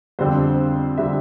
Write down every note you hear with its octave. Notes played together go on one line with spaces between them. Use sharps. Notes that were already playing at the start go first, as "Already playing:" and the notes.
F2 D3 G3 C4 C5
D3 G3 C4 E5